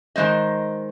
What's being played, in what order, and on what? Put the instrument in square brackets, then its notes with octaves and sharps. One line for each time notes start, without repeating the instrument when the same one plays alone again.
[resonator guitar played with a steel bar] D#3 G#3 C5 D#5